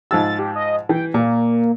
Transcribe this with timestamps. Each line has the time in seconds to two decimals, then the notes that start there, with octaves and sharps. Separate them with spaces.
0.11 G#2 F3 E6 A6
0.39 G4
0.55 D#5
0.89 E3 G5
1.14 A#2 A#3